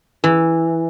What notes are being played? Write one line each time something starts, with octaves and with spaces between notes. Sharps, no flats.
E3